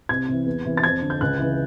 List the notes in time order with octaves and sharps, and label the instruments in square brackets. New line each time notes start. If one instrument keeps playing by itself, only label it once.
[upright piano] C2 G#6
C3 E3
E2
C3 E3
A6
F2 G#6
D3
G6
C#2 F#6
C#3 E3